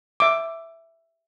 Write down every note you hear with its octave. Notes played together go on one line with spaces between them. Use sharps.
E5 D6